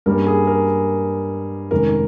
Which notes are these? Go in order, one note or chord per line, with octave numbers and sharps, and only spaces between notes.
G2 G3 A#3 C#4 A#4
G#4
A#4
F1 F2 D#3 G#3 C#4 A#4